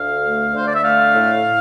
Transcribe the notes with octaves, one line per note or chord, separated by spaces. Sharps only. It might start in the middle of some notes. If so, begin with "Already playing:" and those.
Already playing: D2 F5
A3
D3 C5
D5
E5
A3 F5
A2
A2